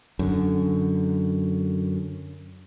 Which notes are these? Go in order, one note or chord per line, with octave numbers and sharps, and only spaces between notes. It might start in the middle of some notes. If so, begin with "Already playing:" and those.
F#2 D3